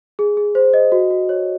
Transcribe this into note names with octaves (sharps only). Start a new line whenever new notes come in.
G#4
G#4
C5
D#5
F#4
F#4
C#5